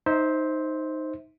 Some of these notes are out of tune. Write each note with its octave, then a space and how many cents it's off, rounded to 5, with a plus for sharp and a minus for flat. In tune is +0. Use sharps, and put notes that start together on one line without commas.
D#4 +0 C5 +0 E5 -25